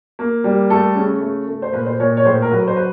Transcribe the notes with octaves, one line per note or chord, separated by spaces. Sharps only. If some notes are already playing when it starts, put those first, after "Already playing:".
A#3
G3
A3 A4
C#3
A3
A3
C5
A#2 B4
C5
A#2 C#5
C#5
A2 C5
A#4
F#3 B4
C5
B4